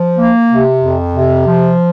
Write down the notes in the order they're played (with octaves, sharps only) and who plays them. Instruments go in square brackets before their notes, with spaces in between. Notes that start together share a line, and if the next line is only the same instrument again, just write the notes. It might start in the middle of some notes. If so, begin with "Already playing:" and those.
Already playing: [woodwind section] F3
A#3
C3
F2
C3
F3